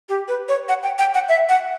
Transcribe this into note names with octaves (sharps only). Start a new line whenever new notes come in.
G4
B4
C#5
F#5
G5
G5
F#5
E5
F#5